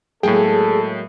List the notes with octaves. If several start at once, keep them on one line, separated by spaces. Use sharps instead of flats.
A2 F#3 G#3 A#3 G#4 A4 G5